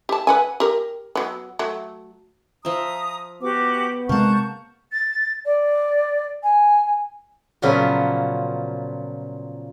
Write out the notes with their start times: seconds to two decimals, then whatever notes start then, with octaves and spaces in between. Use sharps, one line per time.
0.09 G4 A5
0.27 B4 F#5 G#5
0.60 G4 A#4
1.15 F#3 B3
1.59 F#3 A3
2.65 F3 E5 A#5 D#6
3.42 B3 F#4 G4 D6
4.09 C3 G#3 A#3 F#5 A5 C#6 G6
4.91 A6
5.45 D5
6.43 G#5
7.62 A#2 C#3 F3 F#3 B3